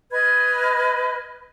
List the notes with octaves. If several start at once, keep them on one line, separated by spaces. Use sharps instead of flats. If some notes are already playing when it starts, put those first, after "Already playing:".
B4 D#5 F6 G#6